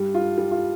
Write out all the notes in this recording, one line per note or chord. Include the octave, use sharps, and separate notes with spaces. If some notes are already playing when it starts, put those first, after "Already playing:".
Already playing: G2 G3
F4
G3
F4